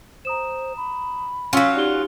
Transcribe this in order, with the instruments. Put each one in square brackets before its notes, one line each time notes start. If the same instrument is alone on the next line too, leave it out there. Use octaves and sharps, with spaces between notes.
[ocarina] C5 [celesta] A#5 D#6 E7
[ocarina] B5
[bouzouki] F#3 F4 [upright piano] C#4 [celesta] F5 E6 B6
[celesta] D#4 G4 G7 [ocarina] D5